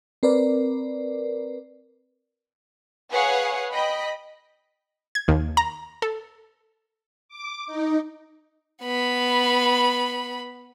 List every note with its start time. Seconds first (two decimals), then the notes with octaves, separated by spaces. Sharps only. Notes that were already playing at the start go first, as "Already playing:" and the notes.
0.23 C4 A#4 B4 D5
3.12 G#4 B4 C#5 F5 F#5 G#5
3.73 D#5 G5 B5
5.15 G#6
5.28 D#2
5.57 A#5
6.02 A4
7.29 D6
7.67 D#4
8.83 B3 B5